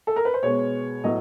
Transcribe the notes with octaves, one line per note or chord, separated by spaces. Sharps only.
A4
A#4
B4
C5
B2 G#3 B3 C#5
A2 F#3 B3 D#5